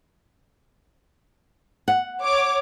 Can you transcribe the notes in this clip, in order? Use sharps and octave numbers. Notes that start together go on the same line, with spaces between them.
F#5
C#5 D6